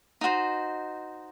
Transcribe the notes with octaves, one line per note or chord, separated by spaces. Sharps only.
D#4 F#4 C5